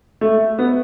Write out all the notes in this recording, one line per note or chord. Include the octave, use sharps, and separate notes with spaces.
A3
B3